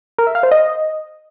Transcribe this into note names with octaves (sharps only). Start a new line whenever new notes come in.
A#4
E5
F5
C5
D#5